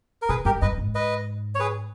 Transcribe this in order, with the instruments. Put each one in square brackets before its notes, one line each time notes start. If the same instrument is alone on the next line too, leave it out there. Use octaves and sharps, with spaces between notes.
[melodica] A#4
[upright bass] B2 [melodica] G#4 B4
[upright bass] G2 [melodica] G4 A#4
[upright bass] G2 [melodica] B4 D#5
[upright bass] G#2
[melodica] B4 D#5
C#5
G#4 B4